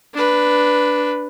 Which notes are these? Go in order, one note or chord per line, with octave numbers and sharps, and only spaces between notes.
D4 B4